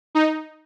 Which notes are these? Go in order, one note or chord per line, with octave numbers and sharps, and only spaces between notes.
D#4